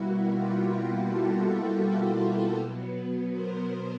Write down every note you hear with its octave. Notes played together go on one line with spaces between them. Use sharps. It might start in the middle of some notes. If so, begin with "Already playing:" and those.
Already playing: B2 G3 A#3 E4 F#4
F4 G4
G4 A4
B2 F#3 B3
A#4 C5